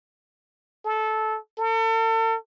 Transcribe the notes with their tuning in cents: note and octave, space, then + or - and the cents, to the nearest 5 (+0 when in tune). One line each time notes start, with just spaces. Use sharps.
A4 -15
A4 +40